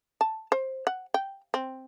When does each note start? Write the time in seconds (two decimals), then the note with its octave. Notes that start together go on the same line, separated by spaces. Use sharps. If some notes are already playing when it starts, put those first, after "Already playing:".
0.21 A5
0.52 C5
0.87 F#5
1.14 G5
1.54 C4